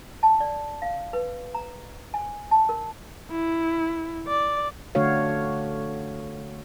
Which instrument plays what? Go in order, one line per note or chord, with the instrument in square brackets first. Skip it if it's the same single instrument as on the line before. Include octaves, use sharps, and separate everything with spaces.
[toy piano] A5
D5
F5
B4
A#5
G#5
A5
A#4
[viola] E4
D5
[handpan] D3 A3 D4 F#4 C#5 F5